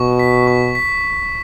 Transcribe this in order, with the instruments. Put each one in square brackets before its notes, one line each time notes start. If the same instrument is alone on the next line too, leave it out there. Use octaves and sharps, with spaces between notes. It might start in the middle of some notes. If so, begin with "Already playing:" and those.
Already playing: [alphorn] B2 [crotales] C#6
[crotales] B6
C#6
B6